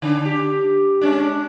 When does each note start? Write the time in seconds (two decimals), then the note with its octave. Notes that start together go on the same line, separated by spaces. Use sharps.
0.02 D3 D4
0.25 G4
1.01 G#3 C#4 D4